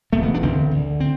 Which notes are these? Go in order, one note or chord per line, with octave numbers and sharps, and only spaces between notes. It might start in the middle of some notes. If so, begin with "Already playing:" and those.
E1 E2 B2 A3
B3
D4
E1 D2 D3 C4
D2 D3
C4